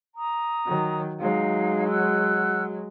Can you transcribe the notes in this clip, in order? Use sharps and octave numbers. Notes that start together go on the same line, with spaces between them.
A#5 D#6
D#3 F#3
F#3 G#3 D#4 F5
F#5 E6 F#6